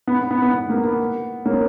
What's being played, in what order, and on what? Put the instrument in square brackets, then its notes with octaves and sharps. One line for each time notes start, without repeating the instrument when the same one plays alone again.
[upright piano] B3
B3
B3
B3
B3
A#3
B3
A#3 C#4